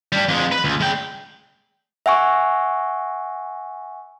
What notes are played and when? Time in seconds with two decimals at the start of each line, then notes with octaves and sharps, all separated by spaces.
0.12 G3 D4
0.28 F2 G#3
0.52 B4
0.64 C#2
0.81 G#3 G5
2.06 E5 F#5 G#5 C#6